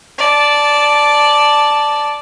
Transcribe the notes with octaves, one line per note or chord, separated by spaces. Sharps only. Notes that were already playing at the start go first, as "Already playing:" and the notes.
D5 A5